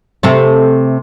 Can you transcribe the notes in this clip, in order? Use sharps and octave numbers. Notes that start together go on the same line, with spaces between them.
C3 A3 C4